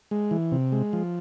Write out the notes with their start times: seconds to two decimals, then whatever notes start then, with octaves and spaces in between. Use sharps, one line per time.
0.11 G#3
0.31 E3
0.52 C3
0.72 G#3
0.93 F3